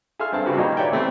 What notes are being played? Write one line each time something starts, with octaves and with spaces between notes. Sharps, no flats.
G#4 A4 E5 F5 C6 F6
G2 C4 A5
C#3 G3 C4 F#4 G4 B4
A#2 D#3 G#3 A#3 D#4 D#5
G4 B4 C#5 D5 E5 G5
C3 E3 A3 B3 C4